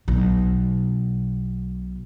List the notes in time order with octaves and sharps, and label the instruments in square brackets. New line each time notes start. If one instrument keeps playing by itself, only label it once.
[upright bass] B1 B2